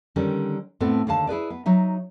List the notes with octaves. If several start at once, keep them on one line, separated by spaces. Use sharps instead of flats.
D3 D#3 G3 C#4
A2 B3 C4 A4
D#2 D3 F5 A5
E4 G#4 B4 D5
B3
F#3 D#4 E5